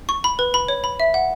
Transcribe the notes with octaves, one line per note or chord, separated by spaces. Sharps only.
C#6
B5
B4
B5
C#5
B5
E5
F#5